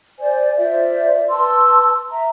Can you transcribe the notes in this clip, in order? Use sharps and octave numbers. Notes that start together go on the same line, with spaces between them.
C5 D5 G#5
F4 C5 D5 E5
B4 A5 C6 E6
E5 A#5